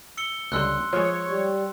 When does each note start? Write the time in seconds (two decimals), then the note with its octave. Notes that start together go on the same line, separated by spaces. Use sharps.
0.17 E6 C#7 G7
0.52 C#2 D3 G3 C6 E6 F#6
0.93 F3 G#3 C#5
1.29 G3